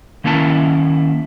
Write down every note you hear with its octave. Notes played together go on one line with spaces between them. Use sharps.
D#3 A#3 C#4 E4 A5